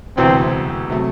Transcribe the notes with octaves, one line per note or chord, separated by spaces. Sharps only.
E1 D2 C3 E3 C4
C3 F#3 A3